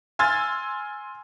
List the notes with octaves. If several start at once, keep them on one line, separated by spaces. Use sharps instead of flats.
G#5 C6 E6 F6 G#6 A6